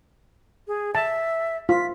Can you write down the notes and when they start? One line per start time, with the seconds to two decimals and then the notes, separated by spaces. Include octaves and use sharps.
0.68 G#4
0.95 E5 A5
1.69 F4 B6